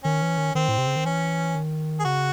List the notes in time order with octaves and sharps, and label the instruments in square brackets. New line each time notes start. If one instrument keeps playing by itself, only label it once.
[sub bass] D#3 [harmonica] C#4
[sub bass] E3
D#3
[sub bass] D#3 [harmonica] C4
[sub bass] A2
C3
C#3
D#3
[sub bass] E3 [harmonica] C#4
[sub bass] D#3
[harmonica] G#4
[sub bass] C#3 [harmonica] F#4